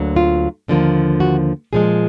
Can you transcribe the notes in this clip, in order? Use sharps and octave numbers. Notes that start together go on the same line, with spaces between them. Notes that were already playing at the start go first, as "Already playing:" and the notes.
Already playing: D2 D3 F#3 A#3
F4
D#2 D3 F3 A#3
F#4
A#2 F3 G#3 G#4